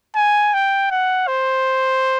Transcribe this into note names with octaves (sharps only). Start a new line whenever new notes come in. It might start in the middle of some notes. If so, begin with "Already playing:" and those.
G#5
G5
F#5
C5